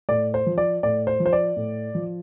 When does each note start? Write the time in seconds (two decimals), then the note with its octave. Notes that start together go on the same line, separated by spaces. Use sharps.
0.09 A2 D5
0.34 C5
0.46 F3
0.58 D5
0.83 A2 D5
1.07 C5
1.20 F3
1.26 C5
1.33 D5
1.56 A2
1.95 F3